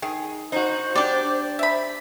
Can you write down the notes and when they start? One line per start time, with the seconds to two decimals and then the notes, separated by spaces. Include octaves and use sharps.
0.02 D#3 G#4
0.52 D#4 F#4 C5
0.95 D4 G4 D5 D6
1.59 E5 B5